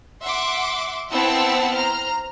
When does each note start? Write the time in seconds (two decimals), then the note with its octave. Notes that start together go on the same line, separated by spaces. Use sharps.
0.21 E5 F#5 C6 D6
1.11 B3 C4 E4 F#5 A5 E6
1.74 C5 A#5 F6